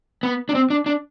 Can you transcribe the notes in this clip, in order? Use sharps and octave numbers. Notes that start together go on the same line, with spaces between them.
B3
D4
C4
D4
D4